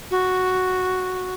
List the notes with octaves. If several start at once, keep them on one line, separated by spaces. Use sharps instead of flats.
F#4